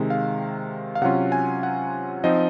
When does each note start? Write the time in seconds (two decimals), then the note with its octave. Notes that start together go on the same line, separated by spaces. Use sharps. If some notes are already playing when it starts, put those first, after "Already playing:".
Already playing: C3 D#3 G#3
0.10 F5
0.95 F5
1.02 C3 F#3 C#4 F4 F#5
1.32 G#5
1.63 F#5
2.24 F3 C4 D#4 D#5